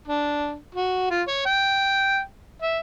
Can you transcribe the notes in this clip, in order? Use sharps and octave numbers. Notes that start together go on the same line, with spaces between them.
D4
F#4
F4
C#5
G5
E5